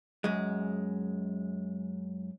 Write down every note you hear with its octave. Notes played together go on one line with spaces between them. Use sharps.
F#2 G#3